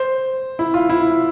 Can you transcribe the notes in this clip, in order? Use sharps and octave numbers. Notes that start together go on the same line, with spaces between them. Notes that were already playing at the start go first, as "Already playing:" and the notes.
Already playing: C5
E4
F4
E4